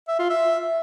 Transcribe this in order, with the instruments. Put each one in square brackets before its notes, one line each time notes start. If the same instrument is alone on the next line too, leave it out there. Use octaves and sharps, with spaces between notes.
[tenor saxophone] E5
F4
E5